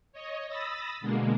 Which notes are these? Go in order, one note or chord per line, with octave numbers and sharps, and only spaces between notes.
C#5 D#5
B5 D#6 E6 A6 A#6
B2 D3 G#3 A#3